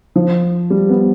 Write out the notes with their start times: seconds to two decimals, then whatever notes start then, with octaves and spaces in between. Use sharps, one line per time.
0.16 F3
0.70 G3
0.89 B3